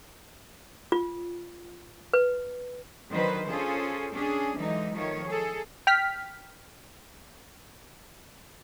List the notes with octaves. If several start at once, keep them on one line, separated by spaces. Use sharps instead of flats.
F4
B4
D3 D#3 F#3 B4 C5
C#4 F4 G#4 A4 C5
C#4 D4 G#4
D3 E3 F#3 G#3 D#4
D#3 F3 A3 C#5
G#4 A4
G5 F6 B6